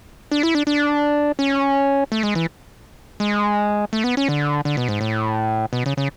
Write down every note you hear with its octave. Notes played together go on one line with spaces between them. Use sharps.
D4
E4
D4
D4
C#4
A3
G#3
E3
G#3
A3
B3
C#4
D3
D3
B2
G#2
A2
B2
C#3
C#3